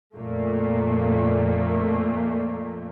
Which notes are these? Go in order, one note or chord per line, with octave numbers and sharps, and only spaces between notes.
F2 A#2 A3 A#3